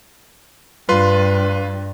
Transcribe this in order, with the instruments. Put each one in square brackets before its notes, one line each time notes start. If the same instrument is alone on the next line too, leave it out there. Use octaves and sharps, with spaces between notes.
[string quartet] G2 [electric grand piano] F4 B4 C6